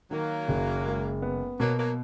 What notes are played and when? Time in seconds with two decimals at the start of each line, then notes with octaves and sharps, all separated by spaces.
0.10 D#3 F#3 A#3
0.48 F#1
0.85 G#3
1.22 B3
1.59 B2 F#3 A#3
1.78 F#3 A#3